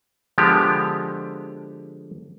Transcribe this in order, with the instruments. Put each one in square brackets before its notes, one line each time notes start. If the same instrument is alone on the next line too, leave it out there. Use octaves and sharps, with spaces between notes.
[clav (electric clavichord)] D3 F3 G#3 B3 G4